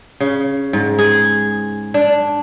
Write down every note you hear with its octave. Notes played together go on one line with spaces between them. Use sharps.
C#3
G#2
G#4
D4